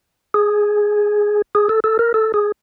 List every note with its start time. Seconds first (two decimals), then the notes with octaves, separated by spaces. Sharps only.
0.34 G#4
1.55 G#4
1.69 A4
1.84 A4
1.99 A#4
2.14 A4
2.34 G#4